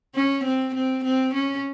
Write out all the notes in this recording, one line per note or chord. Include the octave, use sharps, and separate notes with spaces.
C#4
C4
C4
C4
C#4